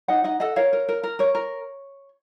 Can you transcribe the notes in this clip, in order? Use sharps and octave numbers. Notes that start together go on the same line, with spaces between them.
D#4 D#5 F#5
D#4 D#5 F#5
A4 D#5 F#5
A#4 C#5 F5
A#4
A#4
A#4
A#4 C#5
A#4